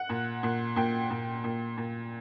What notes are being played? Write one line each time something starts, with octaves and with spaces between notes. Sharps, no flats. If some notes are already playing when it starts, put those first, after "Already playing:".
Already playing: F#5
A#2
A#2
A#2 G5
A#2
A#2
A#2